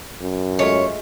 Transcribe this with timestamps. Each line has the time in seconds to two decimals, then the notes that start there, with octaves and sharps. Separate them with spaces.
0.22 F#2
0.59 G#3 A3 F4 C#5